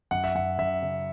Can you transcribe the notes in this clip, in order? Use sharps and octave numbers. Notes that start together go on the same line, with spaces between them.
F#2 F#5
E5
F#2 F#5
F#2 E5
C#3